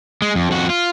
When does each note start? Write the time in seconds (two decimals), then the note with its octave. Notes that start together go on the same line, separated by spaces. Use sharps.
0.22 G#3
0.35 F2
0.51 F2 F#4
0.70 F4